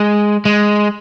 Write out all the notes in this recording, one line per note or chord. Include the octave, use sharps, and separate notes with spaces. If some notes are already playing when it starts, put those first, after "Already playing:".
Already playing: G#3
G#3